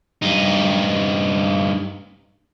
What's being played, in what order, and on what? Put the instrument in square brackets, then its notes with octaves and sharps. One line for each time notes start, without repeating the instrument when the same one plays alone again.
[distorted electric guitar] G2 D#4